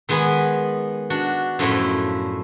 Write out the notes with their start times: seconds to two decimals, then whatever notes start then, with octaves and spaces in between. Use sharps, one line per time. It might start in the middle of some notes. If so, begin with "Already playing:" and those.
0.09 D#3 G#3 B3 G#5 B5
1.10 D4 F#4
1.59 F#2 A2 F3 A3 E4